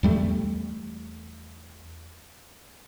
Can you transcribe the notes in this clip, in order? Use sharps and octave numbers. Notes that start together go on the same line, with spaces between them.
E2 G3 A3